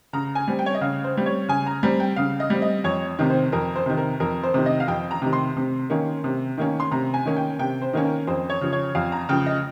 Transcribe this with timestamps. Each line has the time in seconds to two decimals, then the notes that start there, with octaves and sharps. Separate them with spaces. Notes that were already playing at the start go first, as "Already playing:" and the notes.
0.13 C#3 A#5
0.35 G#5
0.48 G3 C4
0.59 G5
0.66 C#5
0.75 D#5
0.81 C#3 F5
1.04 C5
1.15 G3 C4
1.26 C#5
1.48 C#3 G#5
1.66 A#5
1.83 G3 C4 A#5
2.00 G5
2.16 C#3 F5
2.40 D#5
2.50 G3 C4
2.62 D#5
2.84 F2 C#5
3.19 C3 D#3
3.30 C5
3.52 F2 A#4
3.76 C5
3.86 C3 D#3
3.97 A#4
4.20 F2 A#4
4.43 C5
4.54 C3 D#3
4.66 D#5
4.80 F5
4.88 F2 G5
5.11 A#5
5.22 C3 D#3
5.33 C6
5.57 C3
5.90 D#3 A#3 C#4
6.24 C3
6.58 D#3 A#3 C#4
6.80 C6
6.91 C3 A#5
7.14 G#5
7.26 D#3 A#3 C#4
7.37 G5
7.59 C3 G5
7.82 C5
7.93 D#3 A#3 C#4
8.05 A#4
8.27 F2 C5
8.50 C#5
8.61 C#3 F3
8.73 C#5
8.95 F2 F5
9.12 A#5
9.29 C#3 F3 G5
9.46 D#5